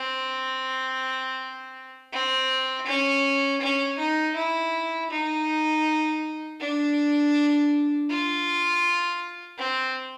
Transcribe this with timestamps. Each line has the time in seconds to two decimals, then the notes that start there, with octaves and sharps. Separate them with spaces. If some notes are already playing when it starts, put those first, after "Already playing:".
Already playing: C4
2.12 C4
2.87 C#4
3.61 C#4
3.98 D#4
4.36 E4
5.11 D#4
6.60 D4
8.10 F4
9.58 C4